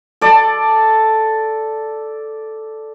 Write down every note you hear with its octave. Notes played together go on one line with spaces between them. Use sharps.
A4 D5